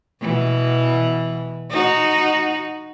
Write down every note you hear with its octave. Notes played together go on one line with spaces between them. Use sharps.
B2 E3
D#4 F#4